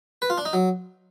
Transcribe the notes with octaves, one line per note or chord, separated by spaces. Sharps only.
B4
F4
D4
D#4
F#3